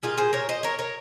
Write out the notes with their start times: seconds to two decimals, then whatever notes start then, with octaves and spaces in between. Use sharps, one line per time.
0.03 A#2 G3 F4 G#4
0.17 G#4 C5
0.33 A#4 C#5
0.49 C5 D#5
0.63 A#4 C#5
0.79 A#4 C#5